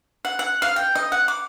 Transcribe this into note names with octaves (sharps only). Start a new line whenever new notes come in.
F#5
F#5
F5
G5
D#5
F#5
D6